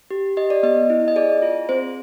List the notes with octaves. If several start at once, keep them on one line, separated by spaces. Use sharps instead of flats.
G4
G4 D#5
D5
B3 D#5
E4
D#5
G#4 D5
F4
C4 C5